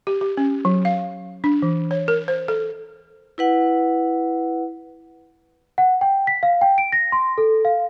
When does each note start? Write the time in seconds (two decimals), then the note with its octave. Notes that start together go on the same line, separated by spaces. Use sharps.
0.07 G4
0.21 G4
0.37 C#4
0.65 F#3
0.85 F5
1.44 D4
1.62 E3
1.91 C#5
2.08 A#4
2.28 C5
2.48 A4
3.38 E4 B4 F#5
5.78 F#5
6.01 G5
6.27 B6
6.43 F5
6.61 G5
6.78 D7
6.92 A#6
7.12 C6
7.38 A4
7.65 F5